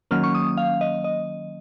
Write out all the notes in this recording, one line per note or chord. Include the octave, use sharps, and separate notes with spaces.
D#3 F#3 A#3 C#4 F6
C#6
D#6
F5
D#5
D#5